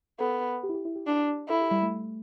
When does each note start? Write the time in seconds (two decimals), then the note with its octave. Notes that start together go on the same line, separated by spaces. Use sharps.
0.20 B3 A4
0.63 G4
0.69 E4
0.74 G4
0.85 E4
0.96 G4
1.07 D4
1.49 E4 A4
1.61 G4
1.71 G3
1.82 A3